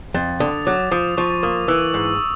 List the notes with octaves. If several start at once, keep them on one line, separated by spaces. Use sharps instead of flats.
F2 A6
D3 D#6
F#3 D6
F3 D#6
F3 C#6
A#3 D#6
E3 E6
G#2